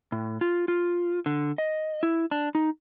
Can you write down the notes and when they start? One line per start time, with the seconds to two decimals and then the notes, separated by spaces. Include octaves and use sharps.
0.12 A2
0.41 F4
0.68 F4
1.26 D3
1.58 D#5
2.03 E4
2.31 D4
2.55 D#4